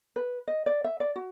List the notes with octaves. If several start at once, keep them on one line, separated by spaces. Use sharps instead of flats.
B4
D#5
D5
E5
D5
F#4